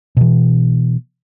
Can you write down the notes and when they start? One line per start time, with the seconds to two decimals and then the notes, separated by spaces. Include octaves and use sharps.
0.17 B2 E3